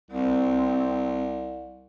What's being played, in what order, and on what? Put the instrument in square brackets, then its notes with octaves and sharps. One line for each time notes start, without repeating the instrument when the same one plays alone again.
[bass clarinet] C2 [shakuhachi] C4